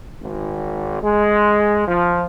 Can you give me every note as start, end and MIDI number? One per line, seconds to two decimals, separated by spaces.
0.22 1.02 32
1.03 1.84 56
1.87 2.26 53